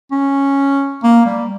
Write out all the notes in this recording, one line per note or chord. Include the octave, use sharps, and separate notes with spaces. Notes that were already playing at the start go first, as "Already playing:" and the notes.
C#4
A#3
G3